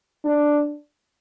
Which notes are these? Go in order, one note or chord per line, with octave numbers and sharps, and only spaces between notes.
D4